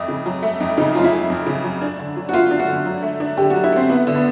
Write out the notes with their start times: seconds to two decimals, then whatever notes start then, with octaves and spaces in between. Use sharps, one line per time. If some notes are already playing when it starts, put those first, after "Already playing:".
Already playing: F2 A3
0.08 C#3
0.26 F#3
0.43 A3
0.60 F2
0.77 C#3 D#4
0.95 F#3 F4
1.04 E4
1.12 A3
1.30 F2
1.46 C#3
1.64 F#3
1.81 D4
1.99 D3
2.16 F#3
2.29 F#4
2.33 A3 F4
2.51 D4
2.59 F#4
2.68 D3
2.86 F#3
3.03 A3
3.20 D4
3.37 D3 G4
3.50 F#3 F#4
3.64 E4
3.72 A3 C4
3.89 B3 E4
4.07 D3
4.15 B3